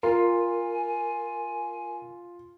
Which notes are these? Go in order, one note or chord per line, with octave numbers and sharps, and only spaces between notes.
F4 A#4 G#5